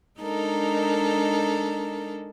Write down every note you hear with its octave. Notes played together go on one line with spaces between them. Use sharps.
G#3 D4 D#4 A4 A#4